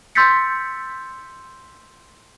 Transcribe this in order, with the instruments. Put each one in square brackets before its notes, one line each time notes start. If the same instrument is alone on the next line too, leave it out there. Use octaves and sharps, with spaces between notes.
[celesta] C6 E6 G6 A6 B6 C#7